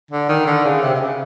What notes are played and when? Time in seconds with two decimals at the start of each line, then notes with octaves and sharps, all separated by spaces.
0.11 D3
0.29 D#3
0.47 D3
0.65 C#3
0.83 C3
0.95 C3
1.00 C#3